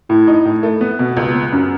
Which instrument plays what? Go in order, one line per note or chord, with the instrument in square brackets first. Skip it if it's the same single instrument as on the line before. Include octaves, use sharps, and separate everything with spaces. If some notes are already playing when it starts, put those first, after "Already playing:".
[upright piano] A2 [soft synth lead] E4
[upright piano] D#4
A2
A3
B3
B2
C#2
B3
[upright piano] F#2 [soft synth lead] C#4